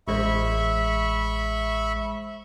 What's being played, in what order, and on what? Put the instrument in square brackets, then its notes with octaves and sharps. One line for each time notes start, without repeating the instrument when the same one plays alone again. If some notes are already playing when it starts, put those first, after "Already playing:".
[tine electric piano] A1 G#3 C5 [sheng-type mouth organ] E5 B5 C#6